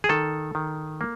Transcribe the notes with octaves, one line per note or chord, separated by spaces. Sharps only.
G#4
D#3 A4
D#3
A#3